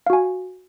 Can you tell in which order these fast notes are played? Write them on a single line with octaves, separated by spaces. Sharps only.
F5 F#4 G#5